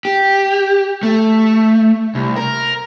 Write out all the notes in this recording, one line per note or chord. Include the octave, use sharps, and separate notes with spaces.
G4
A3
C2
A#4